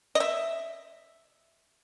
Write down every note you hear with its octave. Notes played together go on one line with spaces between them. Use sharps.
D#5
E5